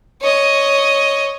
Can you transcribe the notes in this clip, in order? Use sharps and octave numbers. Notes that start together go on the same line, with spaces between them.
C#5 D#5